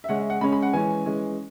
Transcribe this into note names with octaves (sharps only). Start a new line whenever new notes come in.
E5
C#3 G#3 C#4 F#5
E5
F#5
C#3 G#3 C#4 B5
B5
F#5
E3 G#3 C#4 G#5
E3 G#3 C#4